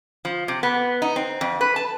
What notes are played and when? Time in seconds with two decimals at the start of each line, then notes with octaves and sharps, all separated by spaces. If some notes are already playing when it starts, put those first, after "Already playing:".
0.25 F3
0.48 C3
0.63 B3
1.02 D#4
1.16 C4
1.41 F2
1.61 B4
1.76 A5